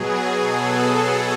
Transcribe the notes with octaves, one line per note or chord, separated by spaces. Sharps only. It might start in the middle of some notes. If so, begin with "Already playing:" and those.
Already playing: B2 F#3 G#4
A4